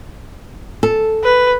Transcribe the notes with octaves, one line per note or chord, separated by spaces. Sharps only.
A4
B4